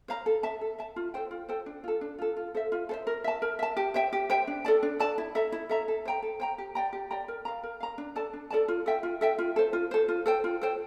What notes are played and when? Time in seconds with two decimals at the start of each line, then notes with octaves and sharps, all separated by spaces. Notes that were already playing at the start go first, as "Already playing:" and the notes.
0.08 C5 F5 A#5
0.26 A4
0.43 E5 A5
0.61 A4
0.79 E5 A5
0.96 F4
1.14 A4 C5 G5
1.31 F4
1.49 A4 C5 G5
1.66 D4
1.84 F4 A4
2.01 D4
2.19 F4 A4
2.37 F4
2.55 A4 C5 E5
2.72 F4
2.89 A4 C5 E5
3.07 A#4
3.24 E5 A5
3.42 A#4
3.59 E5 A5
3.77 G4
3.94 C5 E5 G5
4.13 G4
4.30 C5 E5 G5
4.47 D4
4.65 A4 D5 A5
4.83 D4
5.00 A4 D5 A5
5.18 E4
5.35 A4 E5 A#5
5.52 E4
5.69 A4 E5 A#5
5.88 A4
6.06 C5 G5 A#5
6.22 A4
6.40 C5 G5 A#5
6.58 G4
6.75 D5 G5 A#5
6.93 G4
7.11 D5 G5 A#5
7.28 A#4
7.45 F5 A#5
7.63 A#4
7.80 F5 A#5
7.98 D4
8.16 A4 D5 A5
8.33 D4
8.51 A4 D5 A5
8.68 F4
8.86 A4 E5 G5
9.03 F4
9.21 A4 E5 G5
9.39 F4
9.56 A4 C5
9.73 F4
9.91 A4 C5
10.09 F4
10.26 A4 C5 G5
10.44 F4
10.62 A4 C5 G5